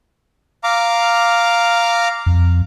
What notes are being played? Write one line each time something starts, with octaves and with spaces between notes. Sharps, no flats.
F5 A#5 D6
F2